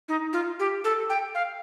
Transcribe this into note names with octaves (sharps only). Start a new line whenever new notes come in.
D#4
F4
G4
A4
G5
F5